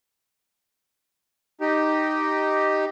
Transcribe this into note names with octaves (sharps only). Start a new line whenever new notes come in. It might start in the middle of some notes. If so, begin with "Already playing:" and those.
D#4 G4